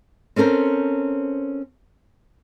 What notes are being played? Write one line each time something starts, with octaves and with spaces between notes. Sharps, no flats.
C4 C#4 A4 A#4 C5